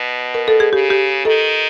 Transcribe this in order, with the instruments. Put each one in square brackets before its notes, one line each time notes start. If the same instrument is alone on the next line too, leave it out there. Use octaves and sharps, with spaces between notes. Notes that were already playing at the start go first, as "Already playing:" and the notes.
Already playing: [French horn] B2
[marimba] A#4
A4
G#4
[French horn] C#3 [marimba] G4
[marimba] G4
[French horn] D#3 [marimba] A4